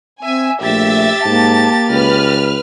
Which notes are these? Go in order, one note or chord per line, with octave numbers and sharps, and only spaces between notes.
C4 E5 G#5
A#1 A3 G4 E5 A6
G#2 A#3 A5
C#2 B4 F6